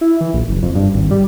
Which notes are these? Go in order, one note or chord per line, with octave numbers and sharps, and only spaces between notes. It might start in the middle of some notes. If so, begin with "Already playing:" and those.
E4
E3
A#1
F#1
F2
G2
G#1
G3